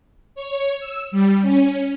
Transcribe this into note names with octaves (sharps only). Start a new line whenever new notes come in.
C#5
E6
G3
C#4